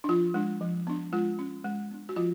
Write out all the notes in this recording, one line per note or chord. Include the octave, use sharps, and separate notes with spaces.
D4
F3 F4
G#3 D4
F3
B3 D4
G#3 F4
C#4
G#3
B3 D4
F#4
F3 F4